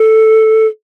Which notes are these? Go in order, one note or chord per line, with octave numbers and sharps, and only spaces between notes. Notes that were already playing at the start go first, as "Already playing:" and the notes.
Already playing: A4